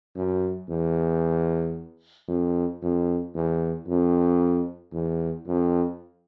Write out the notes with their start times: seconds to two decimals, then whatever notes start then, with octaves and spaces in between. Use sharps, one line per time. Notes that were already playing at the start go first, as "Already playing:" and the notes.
0.16 F#2
0.69 E2
2.28 F2
2.82 F2
3.35 E2
3.88 F2
4.93 E2
5.47 F2